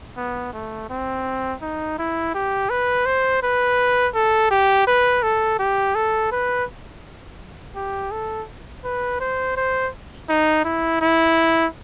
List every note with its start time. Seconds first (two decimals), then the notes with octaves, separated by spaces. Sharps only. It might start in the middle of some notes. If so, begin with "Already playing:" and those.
0.17 B3
0.53 A3
0.90 C4
1.62 D#4
1.98 E4
2.34 G4
2.70 B4
3.06 C5
3.43 B4
4.15 A4
4.51 G4
4.87 B4
5.23 A4
5.59 G4
5.95 A4
6.32 B4
7.76 G4
8.12 A4
8.84 B4
9.20 C5
9.57 C5
10.29 D#4
10.65 E4
11.01 E4